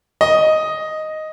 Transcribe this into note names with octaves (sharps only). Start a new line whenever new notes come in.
D#5